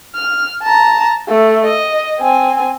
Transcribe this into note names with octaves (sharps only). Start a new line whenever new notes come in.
F6
A5 A#5
A3
D#5
C4 G#5